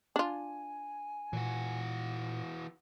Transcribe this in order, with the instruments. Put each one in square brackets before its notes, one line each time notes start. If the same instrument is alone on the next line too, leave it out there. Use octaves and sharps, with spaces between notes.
[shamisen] D4 F4 [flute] G#5
[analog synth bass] A#2 [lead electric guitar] E3 F#4